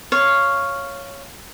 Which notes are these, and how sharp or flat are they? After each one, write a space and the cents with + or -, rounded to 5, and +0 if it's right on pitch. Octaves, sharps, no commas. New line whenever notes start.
C#5 +0 F5 -5